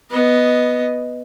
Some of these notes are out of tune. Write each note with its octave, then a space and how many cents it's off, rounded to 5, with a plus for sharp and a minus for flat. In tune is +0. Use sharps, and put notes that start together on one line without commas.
B3 +0 D#5 +0